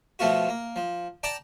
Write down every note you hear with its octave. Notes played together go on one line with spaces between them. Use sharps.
B2 F3 A3 B3 F4 F#4
A#3
F3
D5 G5 A5 A#5 D6